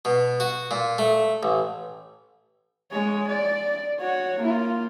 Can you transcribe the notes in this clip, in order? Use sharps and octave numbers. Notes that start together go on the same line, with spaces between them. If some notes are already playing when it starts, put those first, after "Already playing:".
B2
F#4
A#2
A3
A1
G#3 C#5
D5
F#4 C#5
A#3 F4